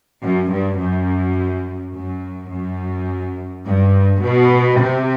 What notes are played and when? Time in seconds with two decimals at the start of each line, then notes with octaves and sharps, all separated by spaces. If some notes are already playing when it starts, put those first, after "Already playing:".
0.24 F#2
0.51 G2
0.80 F#2
1.95 F#2
2.51 F#2
3.66 G2
4.22 B2
4.80 C3